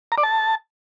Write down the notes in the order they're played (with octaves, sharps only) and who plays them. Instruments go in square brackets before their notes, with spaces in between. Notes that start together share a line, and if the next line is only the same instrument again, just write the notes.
[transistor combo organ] A#5
D5
A5